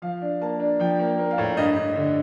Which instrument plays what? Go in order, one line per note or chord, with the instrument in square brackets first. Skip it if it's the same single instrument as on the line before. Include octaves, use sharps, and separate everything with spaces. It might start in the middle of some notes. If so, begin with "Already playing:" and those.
[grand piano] F3 F5
D4
A#3 A5
D4
F3 G5
A#3
A#3
F5
A2
G2 D#5
G2
D3